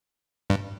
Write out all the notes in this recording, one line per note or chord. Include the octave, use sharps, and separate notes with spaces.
G2